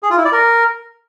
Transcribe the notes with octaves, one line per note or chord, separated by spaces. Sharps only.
G#4
F4
E4
D5
A#4